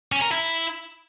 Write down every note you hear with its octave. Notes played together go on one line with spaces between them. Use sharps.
C#4
A#4
E4